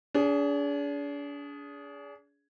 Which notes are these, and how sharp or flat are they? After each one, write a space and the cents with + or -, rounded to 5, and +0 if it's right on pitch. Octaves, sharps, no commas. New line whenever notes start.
D4 -40 G#4 +0